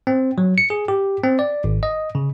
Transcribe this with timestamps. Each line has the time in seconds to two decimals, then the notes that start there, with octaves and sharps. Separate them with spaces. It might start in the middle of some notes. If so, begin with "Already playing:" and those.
0.07 C4
0.38 F#3
0.58 C#7
0.70 G#4
0.88 G4
1.23 C4
1.39 D5
1.64 G#1
1.83 D#5
2.15 C#3